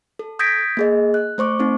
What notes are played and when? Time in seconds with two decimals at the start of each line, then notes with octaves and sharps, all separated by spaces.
0.19 A4
0.39 D#6 G6 G#6 A#6 B6 D7
0.77 A#3 G#4 D#5
1.14 F#6
1.38 A3 C5 C#6 D6
1.59 A3 C4 D#4